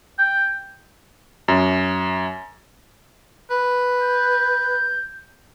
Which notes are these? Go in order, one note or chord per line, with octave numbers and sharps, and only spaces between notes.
G5
F#2
B4
G6